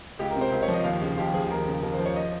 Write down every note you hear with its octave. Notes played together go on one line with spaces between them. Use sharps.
C#2 G4
A#4
C3
C5
C#2 A#4
C#5
F3
D#5
D#2 F5
C#3
D#2 G4
F3 G#4
D#2 A#4
C#3
D#2 A#4
C5
F3
C#5
D#5